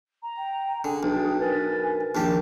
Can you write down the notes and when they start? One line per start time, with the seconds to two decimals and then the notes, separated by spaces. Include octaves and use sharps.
0.23 A#5
0.37 G5
0.84 D3 G#4 G#5
1.03 B1 D4 G5
1.40 A#4 B4 G#5 A6
2.15 A#1 D#2 D#4 G4 A5